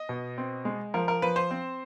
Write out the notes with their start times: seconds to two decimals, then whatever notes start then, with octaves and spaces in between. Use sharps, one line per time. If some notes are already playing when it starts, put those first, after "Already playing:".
Already playing: D#5
0.09 B2
0.38 C4
0.65 G#3
0.94 F3 A#4
1.08 A#4
1.22 F3 B4
1.36 C5
1.51 C4